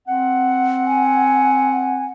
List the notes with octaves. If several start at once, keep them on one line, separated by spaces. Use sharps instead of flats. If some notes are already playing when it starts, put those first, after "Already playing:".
C4 F#5
G#5